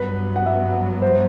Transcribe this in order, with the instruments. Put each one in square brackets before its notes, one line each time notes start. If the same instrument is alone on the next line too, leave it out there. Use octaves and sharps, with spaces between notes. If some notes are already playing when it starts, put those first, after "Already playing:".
Already playing: [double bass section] G2 F#3 B3 [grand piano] B4
[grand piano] F#5
E5
C5